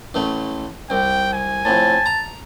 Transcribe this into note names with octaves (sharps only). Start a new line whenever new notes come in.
A1 A3
C2 G5
G#5
F2 A2 A5
A#5